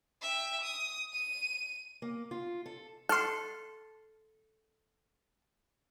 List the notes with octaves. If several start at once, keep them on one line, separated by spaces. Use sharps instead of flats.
E5 G5
D#6
D#7
A#3
F4
A4
A4 C6 F6